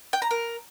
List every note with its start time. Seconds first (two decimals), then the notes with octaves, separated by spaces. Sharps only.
0.13 G5
0.22 A#5
0.31 A#4